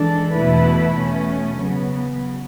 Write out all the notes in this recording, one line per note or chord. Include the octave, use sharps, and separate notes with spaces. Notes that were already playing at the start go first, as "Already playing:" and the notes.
Already playing: E3 G#3 D4 A4
E2 B2 A3 E4 B4
B2 A3 C#4
C#3 F#3 B3